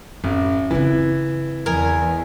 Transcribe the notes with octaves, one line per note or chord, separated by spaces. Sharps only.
A1 F#2
C#3 E3 C4
E2 A#4 D#5 G#5